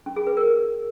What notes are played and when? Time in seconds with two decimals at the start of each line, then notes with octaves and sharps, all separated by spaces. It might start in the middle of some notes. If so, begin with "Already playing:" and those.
0.06 C#4
0.16 G#4
0.27 B4
0.37 A#4